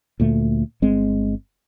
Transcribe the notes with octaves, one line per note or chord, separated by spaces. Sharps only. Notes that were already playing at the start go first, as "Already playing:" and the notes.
D2 A#2 A3 A#3
G1 G#3 C4